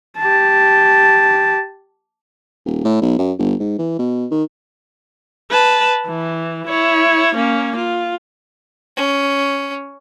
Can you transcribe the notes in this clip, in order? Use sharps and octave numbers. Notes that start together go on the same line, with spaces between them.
G4 A5
D#1
A2
B1
F#2
G1
G#2
E3
B2
D#3
B4 A5
E3
E4 C#5
A#3 C#4
F4
C#4